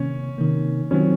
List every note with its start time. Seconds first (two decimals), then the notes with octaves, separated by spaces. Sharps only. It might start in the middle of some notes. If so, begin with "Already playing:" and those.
Already playing: C3 D#3 A#3 C#4
0.38 C3 D#3 A#3
0.91 D#3 F#3 C4 C#4 F4